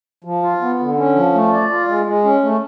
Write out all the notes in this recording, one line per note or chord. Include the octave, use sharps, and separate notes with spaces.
F3
F4
B3
D3
C#4
F3
A3
D5
F4
G#3
G#3
C#4
A3